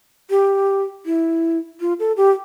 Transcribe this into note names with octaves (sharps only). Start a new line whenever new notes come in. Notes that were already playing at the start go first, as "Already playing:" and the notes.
G4
E4
F4
A4
G4